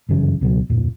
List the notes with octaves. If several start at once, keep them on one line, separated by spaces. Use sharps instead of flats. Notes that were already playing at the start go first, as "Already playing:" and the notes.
G1 F#2 C#3 E3
C#2 B2 E3 F#3
D1 F2 A#2 F3